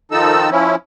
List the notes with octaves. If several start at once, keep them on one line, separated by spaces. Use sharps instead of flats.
D#3 F3 D#4 A4 E6
F3 C#4 E4